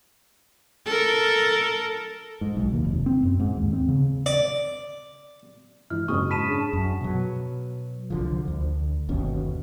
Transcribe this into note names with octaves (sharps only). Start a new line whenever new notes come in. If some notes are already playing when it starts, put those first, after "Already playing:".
A4 A#4
G#2
B1
D#2
F1
C4
F#2
G#2
D#2
C4
C#3
D5
G2 E3 G#3 E4 F6
F#1 G#2 G#3 C#6 D#6
A5 B5 B6 D#7 E7
C#4 D4 G#4
F#2
B2 F#3
C2 D3 F3
D2
G1 D#2 B2 C#4